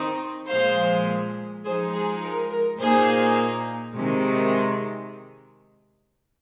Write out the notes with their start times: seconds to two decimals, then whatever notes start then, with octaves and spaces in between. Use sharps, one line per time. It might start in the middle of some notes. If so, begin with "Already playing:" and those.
Already playing: D#3 C4 D#4
0.50 A#2 F3 G#3 C5 F5
1.64 F3 G#3 D#4 G#4 C5
1.93 G#4
2.22 A#4
2.51 A#4
2.79 A#2 A#3 D#4 G#4 C5
3.94 C3 D#3 G#3